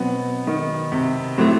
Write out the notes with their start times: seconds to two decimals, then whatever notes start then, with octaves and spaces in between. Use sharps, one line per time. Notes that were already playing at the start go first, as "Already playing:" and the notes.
Already playing: B2 F#3 B3 C4
0.47 D#3
0.92 C3
1.38 A2 C3 F#3 A3